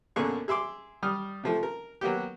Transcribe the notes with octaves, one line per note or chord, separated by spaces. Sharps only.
F#2 B2 D3 A#3 G#4 C#6
G#4 E5 C6 D6
G3 D#6 F6
C3 F3 A3
A#4
F#3 A#3 B3 G4